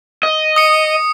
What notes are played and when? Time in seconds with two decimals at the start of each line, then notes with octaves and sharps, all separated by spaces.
0.23 D#5
0.56 D#6 C#7